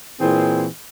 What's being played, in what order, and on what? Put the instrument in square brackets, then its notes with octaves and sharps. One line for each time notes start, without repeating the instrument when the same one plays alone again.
[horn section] A#2 E3 C4 G#4